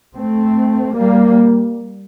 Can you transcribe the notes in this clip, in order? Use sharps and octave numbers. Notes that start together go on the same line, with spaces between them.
A3 C4
G3 A#3